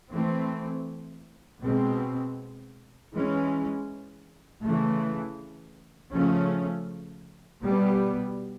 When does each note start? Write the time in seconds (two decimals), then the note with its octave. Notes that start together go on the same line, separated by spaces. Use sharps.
0.13 E3 A3 C4
1.63 B2 G#3 C4
3.13 E3 G#3 C#4
4.62 C#3 E3 A3
6.12 C#3 F3 A3 C#4
7.62 B2 G3 B3